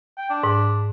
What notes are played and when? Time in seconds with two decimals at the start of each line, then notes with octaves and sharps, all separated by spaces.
0.18 G5
0.30 D4
0.43 G#2